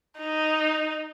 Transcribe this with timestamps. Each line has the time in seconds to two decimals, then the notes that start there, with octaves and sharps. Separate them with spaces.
0.19 D#4